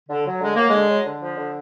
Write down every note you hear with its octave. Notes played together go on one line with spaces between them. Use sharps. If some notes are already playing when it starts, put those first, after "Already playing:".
D3
F#3
D3 G#3
F#3 A#3
D3 G#3
F#3
D3
F3
D3